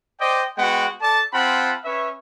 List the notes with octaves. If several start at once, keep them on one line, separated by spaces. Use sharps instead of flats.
C5 D5 D#5 G5
G#3 B3 F#4 F#5 G5
A4 D5 A5
C4 F4 F#5 A5 B5
C#4 B4 C#5 E5